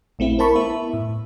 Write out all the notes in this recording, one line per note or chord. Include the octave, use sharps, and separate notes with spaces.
A#1 A3 C4 E4
E4 A#4 C5 A5 B5 C#6
B3 E4 E5
A2